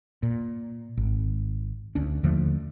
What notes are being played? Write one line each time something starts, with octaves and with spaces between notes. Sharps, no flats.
A#2
G#1
D2 C#4 D4
D#2 D3 F3 A3